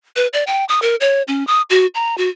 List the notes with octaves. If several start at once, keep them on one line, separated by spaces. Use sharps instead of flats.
B4
D5
G5
D#6
A#4
C#5
C#4
D#6
F#4
A#5
F#4